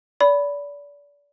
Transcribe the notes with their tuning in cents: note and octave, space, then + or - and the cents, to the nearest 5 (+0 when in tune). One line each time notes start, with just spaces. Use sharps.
D5 -30 B5 +0